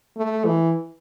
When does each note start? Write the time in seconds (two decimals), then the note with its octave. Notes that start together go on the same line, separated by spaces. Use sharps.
0.17 A3
0.45 E3